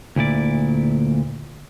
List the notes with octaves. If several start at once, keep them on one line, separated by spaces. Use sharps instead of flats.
D2 A#2 E4 D5